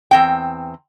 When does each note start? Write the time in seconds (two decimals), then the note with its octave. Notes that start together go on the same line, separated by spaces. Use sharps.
0.11 E2 C4 G5